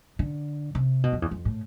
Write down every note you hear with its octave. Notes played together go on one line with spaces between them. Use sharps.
D3
C3
B2
F2
E2
F2
A2